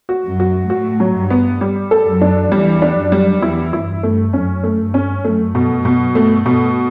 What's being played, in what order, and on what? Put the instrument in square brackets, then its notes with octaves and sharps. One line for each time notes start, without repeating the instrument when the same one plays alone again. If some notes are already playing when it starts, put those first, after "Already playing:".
[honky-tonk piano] F#4
[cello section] F#2 F#3
[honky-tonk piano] F#4
[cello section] A2 A3 [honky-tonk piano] F#4
[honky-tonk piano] F#3
[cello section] G2 G3
[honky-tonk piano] B3
G3
A4
[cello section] F#2 F#3
[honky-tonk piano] D4
[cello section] E2 E3 [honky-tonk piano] G3
[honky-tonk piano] D4
[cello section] F#2 F#3
[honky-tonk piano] G3
[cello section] E2 E3 [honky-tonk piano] E4
[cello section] G2 [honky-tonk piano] E4
[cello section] G2 [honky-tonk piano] A3
[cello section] F#2 [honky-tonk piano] C#4
[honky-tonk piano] A3
[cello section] G2
[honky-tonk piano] C#4
[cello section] F#2 [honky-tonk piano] A3
[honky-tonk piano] B2
[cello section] F#2
[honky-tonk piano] B2
[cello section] G2 [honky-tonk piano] A3
[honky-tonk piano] B2